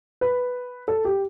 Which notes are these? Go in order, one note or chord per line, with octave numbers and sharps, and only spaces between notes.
B4
A4
G4